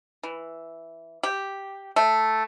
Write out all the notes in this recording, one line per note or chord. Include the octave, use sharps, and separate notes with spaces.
E3
G4
A3